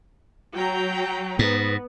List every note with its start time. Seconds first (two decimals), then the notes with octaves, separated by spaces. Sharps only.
0.54 F#3 G5 A#5
1.39 G#2 B3